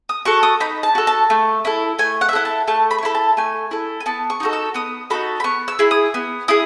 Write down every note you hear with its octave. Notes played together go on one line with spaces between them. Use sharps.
D#6
F#4 A4 C#6
D#6
D#4 B5
A5
F#4 A4
A5
A3
E4 A4
A3 G#5
F#5
E5
E4 A4 F#5
A5
A3 A5
B5
C#6
E4 A4 B5
A5
A3 G#5
E4 A4
G#5
B3 A5
C#6
D#4 F#4 A4
E6
B3 D#6
D#4 F#4 A4 B5
B5
B3 C#6
E6
E4 G#4
D#6
B3
E4 G#4 D#6